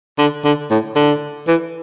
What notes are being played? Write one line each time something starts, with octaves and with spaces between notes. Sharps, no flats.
D3
D3
A2
D3
E3